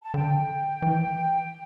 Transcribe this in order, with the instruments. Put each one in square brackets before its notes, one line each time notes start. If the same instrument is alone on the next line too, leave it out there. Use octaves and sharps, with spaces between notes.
[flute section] A5
[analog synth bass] D3 [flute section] G5
[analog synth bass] E3